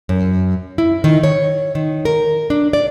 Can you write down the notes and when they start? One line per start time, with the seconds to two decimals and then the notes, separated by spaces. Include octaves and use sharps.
0.09 F#2
0.78 E4
1.04 D#3
1.23 C#5
1.75 D#3
2.05 A#4
2.50 D4
2.73 D5